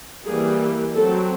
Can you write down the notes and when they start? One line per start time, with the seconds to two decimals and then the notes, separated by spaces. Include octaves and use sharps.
0.26 E3 G3 A#3 G#4
0.95 F#3 A3 C4 A4